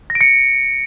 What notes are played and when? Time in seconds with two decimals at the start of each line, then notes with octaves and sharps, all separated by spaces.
0.10 A#6
0.15 D7
0.21 C#7